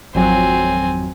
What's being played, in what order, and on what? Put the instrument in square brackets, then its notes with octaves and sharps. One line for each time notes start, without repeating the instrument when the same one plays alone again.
[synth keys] G#1 F2 F#3 [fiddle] C4 G#5